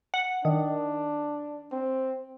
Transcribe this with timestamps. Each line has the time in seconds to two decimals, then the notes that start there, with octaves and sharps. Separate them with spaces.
0.14 F#5
0.45 D#3 D4
1.72 C4